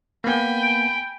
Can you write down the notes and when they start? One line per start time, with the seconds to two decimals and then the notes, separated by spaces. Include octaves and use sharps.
0.24 A#3 B3 G5 G#5 B5
0.63 D7